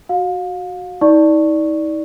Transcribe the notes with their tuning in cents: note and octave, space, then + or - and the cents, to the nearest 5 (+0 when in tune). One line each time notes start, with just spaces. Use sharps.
F#4 +0 F5 +30
D#4 +40 D5 +0 C#6 -5